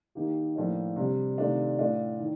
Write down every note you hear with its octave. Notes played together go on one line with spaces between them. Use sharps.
D#3 A#3 D#4 G4
A2 F3 A#3 D4
C3 G3 D4
C3 D#3 A3 D4 F4
A2 A3 D4 F4
D#3